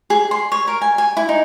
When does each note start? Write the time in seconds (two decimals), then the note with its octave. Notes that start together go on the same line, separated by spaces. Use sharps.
0.10 G#4
0.31 C6
0.52 C#5
0.68 A#4
0.82 G#5
0.98 G#5
1.17 E4
1.29 D#4